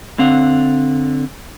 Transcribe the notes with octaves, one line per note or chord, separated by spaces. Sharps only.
D3 C4 F5 F#5